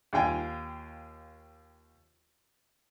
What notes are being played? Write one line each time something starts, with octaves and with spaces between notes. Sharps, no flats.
D#2 F4 G5 G#5